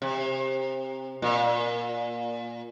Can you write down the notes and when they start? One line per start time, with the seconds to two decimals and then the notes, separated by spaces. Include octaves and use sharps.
0.02 C3
1.22 A#2